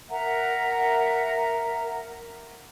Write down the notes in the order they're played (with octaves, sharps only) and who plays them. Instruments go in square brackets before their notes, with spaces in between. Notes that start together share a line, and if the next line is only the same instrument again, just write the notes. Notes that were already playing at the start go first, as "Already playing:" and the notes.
[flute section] A#4 E5 F#5 A#5